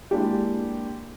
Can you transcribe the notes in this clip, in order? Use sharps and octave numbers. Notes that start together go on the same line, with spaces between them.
G#3 A#3 D4 E4 G4